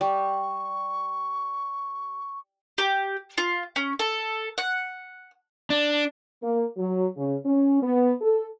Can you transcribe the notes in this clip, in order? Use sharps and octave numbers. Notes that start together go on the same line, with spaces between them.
G3 C#6
G4
F4
C#4
A4
F#5
D4
A#3
F#3
C#3
C#4
B3
A4